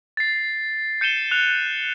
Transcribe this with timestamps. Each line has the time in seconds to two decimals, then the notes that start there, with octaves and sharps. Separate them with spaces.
0.17 A6 C7
1.01 G6 C#7 D#7 E7 G7
1.31 F#6 F7